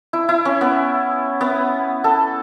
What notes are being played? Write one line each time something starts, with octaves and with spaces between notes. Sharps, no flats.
E4
E4
C#4
B3
B3
A4